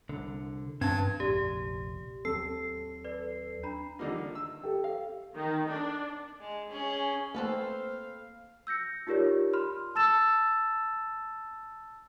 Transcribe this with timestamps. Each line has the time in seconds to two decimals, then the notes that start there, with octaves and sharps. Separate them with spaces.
0.09 C2 D3
0.81 G2 C4 A5 G#6
1.20 F1 A#1 G4 D5
2.25 D#2 F#3 C4 A4 E6 C7
3.04 B4 D5
3.63 D4 A#5 B5
3.99 D3 G3 A#3 D#4 F4
4.18 D#3
4.35 E6
4.63 G4 A4
4.84 F5
5.36 D#3
5.70 D4
6.40 G#3
6.70 C#4 G#4
7.35 A3 A#3 C4 A4 B4 C5 F5
8.67 E6 G6 A#6 C#7
9.07 D#4 F4 G4 A#4 C#5 D5
9.53 B5 C6 F6
9.95 A5 E6 A6 E7